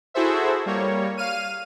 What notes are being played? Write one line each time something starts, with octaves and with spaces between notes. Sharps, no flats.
E4 F#4 G#4 A4 C5 E5
G3 A#3 C#5
F5 F6 D#7